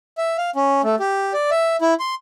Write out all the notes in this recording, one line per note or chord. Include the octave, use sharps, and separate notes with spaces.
E5
F5
C#4
A3
G4
D5
E5
E4
C6